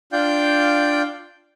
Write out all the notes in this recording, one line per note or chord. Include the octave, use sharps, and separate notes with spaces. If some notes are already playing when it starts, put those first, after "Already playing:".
D4 F4 D5 F5 G5 G6